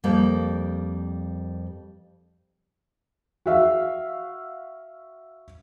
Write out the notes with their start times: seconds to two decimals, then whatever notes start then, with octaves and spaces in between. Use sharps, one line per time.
0.04 F2 G3 A#3
3.46 F#4 E5 F5